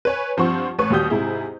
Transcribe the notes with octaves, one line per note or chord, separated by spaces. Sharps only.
B4 C#5 G#5
G2 F3 C4 C5 F#5 C#6
A1 B4 C#6
D#2 G3 F#4 G4 D#6 G6
G#2 C3 E4 G#4